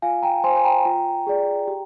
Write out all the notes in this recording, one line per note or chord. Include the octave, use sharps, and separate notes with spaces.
F4 F5 G#5
G5 A#5
C5 G#5 C6
G#5
G5 A#5
F4
G#4 D5
G4